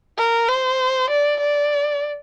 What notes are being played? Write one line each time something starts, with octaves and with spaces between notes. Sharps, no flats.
A#4
C5
D5
D5